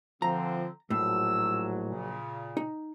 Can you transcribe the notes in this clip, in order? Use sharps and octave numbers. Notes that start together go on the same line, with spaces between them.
D3 F3 C4 A#5
A#1 A2 F#3 E6
A#2 C#3
D#4